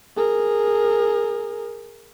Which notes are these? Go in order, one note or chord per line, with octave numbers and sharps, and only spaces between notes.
G#4 A#4